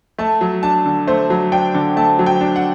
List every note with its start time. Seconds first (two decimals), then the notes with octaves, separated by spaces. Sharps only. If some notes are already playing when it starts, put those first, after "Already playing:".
0.19 A3 A5
0.41 F#3
0.63 D4 A5
0.86 D3
1.07 A3 C5
1.30 F#3
1.52 D4 G5
1.74 D3
1.97 A3 A5
2.19 F#3
2.26 G5
2.41 D4
2.56 F#5